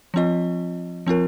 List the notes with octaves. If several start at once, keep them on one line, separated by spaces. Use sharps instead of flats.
F3 C4 F4 D#5
F3 C4 F4 A#4